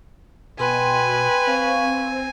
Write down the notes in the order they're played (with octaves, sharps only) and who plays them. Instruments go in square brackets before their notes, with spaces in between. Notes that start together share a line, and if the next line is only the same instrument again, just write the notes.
[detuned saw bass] B2 [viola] B4 [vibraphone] G5 C6 [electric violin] G#5
[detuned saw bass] C4 [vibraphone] F5 C#6